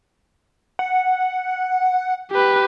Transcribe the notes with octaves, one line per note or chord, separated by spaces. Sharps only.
F#5
G4 B4